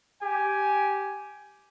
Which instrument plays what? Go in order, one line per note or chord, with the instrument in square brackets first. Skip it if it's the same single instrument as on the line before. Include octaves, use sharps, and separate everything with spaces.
[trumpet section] G4 G#5